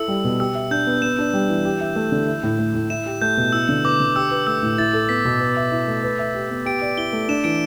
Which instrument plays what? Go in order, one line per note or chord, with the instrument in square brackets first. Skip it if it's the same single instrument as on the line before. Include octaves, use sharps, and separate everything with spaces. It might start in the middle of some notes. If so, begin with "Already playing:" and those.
Already playing: [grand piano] E4 A4 [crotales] E6
[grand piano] G3
B2
[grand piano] G4 [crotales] E6
[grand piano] E5
[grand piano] D4 [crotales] G6
[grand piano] B3
[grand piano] B3 [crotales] E7
[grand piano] D4
G3
E3
G4
E5
A3
D3
E4
A2
A3
A2
[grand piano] E4 [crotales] E7
[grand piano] G4
[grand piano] A3 [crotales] G6
[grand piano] B2
[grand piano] E4 [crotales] E6
[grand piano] D3
[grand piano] B3 [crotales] D6
[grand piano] D3
[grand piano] G4 [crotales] E6
[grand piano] B4
[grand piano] A3 [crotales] E6
[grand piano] A2
[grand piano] E4 [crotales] A6
[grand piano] A4
[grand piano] B3 [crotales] B6
[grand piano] B2
B4
E5
E4
A3
B4
E5
G4
B3
[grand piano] G4 [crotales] D7
[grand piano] D5
[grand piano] E4 [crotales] G7
[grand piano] A3
[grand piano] D4 [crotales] E7
[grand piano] E3 [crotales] D7